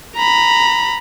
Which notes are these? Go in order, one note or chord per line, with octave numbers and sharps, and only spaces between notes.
A#5 B5